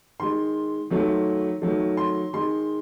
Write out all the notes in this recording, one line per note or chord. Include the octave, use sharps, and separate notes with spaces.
D#3 G#3 C6
D#3 F#3 A3
D#3 F#3 A3
C6
D#3 G#3 C6